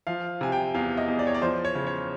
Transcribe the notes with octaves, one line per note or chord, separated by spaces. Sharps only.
F3 F5
C3 G#5
G5
E2 F5
D#5
E2
D5
C#5
D5
F3 C5
C#5
C#3
C#5